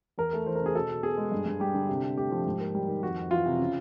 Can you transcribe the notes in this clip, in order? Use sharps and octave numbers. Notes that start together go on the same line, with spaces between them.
E2 A#4
A3
E3 C5
C#3 A#4
G#4
B2 A4
B2
B3 G#4
G#3
G2
G2
G3 G4
D3
C3
C3
A3 G4
F3
G#2
A#3
G3
D#3
F2 F#4
F2
E3 F4
C3
C#3